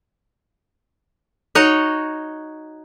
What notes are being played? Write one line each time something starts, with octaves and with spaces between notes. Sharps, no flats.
D#4 F#4 C#5 D#5